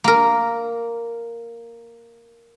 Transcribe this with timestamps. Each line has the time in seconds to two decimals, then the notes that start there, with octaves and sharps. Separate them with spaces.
0.04 A#3 A#4